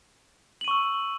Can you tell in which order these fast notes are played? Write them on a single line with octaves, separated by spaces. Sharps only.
F#7 D#7 C#6 E6